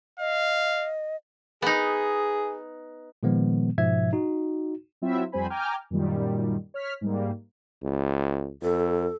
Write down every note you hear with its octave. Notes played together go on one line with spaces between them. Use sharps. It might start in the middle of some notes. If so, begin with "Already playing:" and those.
D#5 F5
B3 D#4 G#4
A#2 D#3 F3 G#3 B3
G#2 B2 F3 E5 G#6
D#4 F#4
F#3 C4 E4 F4 E5
F2 G3 C4 C5 G#5 B5
G5 G#5 A#5 D6 F6 G6
F#2 A#2 D#3 G3
C#5 F6 B6
G#2 G3 A#3
C#2
F2 A4